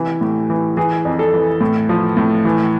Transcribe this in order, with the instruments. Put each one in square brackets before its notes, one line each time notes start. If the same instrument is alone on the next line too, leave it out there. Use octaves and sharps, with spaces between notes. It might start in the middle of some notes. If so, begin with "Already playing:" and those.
Already playing: [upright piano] C3 E3
A2
E3
E3 G#4
F2
A4
E3
A2
F3
A2
E3